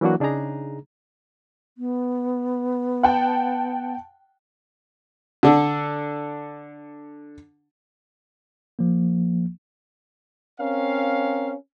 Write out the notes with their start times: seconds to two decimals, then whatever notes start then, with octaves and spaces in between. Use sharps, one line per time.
0.01 E3 F#3 A#3 D4 F#4
0.20 C#3 D4 D#4 G#4 A#5
1.78 B3
3.03 F#5 G5 A5
5.43 D3 D4 A4
8.79 F3 A#3
10.60 C4 C#4 A#4 F5